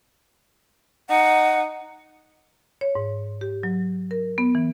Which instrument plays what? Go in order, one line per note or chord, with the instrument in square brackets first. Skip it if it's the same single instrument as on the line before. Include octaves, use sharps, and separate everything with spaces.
[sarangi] D#4 [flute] F#5
[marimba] C#5
G#2
G4
F#3
A#4
B3
E3